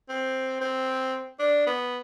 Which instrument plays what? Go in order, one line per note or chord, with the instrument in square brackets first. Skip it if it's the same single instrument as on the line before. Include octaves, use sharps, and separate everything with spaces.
[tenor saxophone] C4
C4
D4
B3